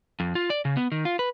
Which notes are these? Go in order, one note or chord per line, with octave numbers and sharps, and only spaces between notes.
F2
F4
D5
C#3
B3
D#3
F4
B4